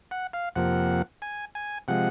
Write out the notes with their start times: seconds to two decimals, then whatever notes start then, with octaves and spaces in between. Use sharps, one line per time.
0.11 F#5
0.33 F5
0.56 F2 C3 F3 A#3 F#5
1.22 G#5
1.55 G#5
1.88 C3 F3 G#3 F#5